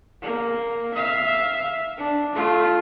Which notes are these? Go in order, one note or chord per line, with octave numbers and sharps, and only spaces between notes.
A#3
E5 F5
D4
A3 F4